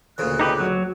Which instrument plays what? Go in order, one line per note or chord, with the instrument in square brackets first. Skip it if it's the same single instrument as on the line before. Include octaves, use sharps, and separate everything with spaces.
[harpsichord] D2 A#2 C#3 [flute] F#6
[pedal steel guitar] D#4 G4 B4
F#3